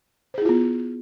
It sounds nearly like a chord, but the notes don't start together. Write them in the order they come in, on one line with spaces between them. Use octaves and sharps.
C5 G#4 E4 F4 B3